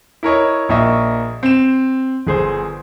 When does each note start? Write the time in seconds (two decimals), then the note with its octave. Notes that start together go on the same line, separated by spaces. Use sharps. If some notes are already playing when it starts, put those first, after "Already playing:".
0.23 E4 A#4 C#5 D#5
0.69 A#1 A#3 D#5 E5 C#6 D#6
1.43 C4 E7
2.27 G1 G#4 C5